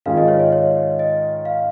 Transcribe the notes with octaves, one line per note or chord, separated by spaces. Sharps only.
G#2 D#3 C#4 F4 G#4 F5
D#5
C#5
D#5
C#5
D#5
F5